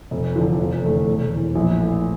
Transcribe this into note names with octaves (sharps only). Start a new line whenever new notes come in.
F1
E2 D3 F3
F1
E2 D3 A3
E1
E2 E3
A#1
A2 E3